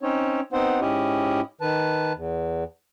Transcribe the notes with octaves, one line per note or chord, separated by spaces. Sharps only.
C4 C#4 D#4 C#5
B3 C4 D#4 C5 F#5
G#2 C#4 E4 G4 D#5
D#3 B4 A5
E2